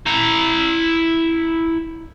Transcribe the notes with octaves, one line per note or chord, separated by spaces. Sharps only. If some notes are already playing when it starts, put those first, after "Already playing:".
E4 A#5